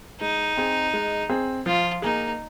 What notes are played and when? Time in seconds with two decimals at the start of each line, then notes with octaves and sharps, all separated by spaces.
0.21 G#3 D#4
0.57 C4 G#4
0.94 G#3
1.29 C4 G#4
1.66 F3 F4
2.02 A#3 D#4 G#4